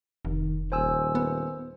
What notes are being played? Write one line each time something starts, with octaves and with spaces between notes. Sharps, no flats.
F1 D#3
D#1 C5 G#5 E6
B3